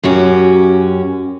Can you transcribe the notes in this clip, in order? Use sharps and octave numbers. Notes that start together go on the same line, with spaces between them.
F#2 C#4 F#4 G4